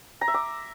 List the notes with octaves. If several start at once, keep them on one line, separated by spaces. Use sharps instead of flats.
A#5
E5
D6